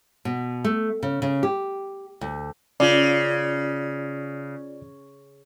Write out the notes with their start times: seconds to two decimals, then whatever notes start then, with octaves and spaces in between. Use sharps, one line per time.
0.25 B2
0.64 A3
1.03 C#3
1.22 C#3
1.43 G4
2.21 D2
2.80 C#3 F4 D5